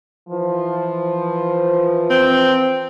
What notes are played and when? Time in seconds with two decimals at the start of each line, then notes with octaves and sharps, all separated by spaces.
0.28 E3 F3
2.10 C4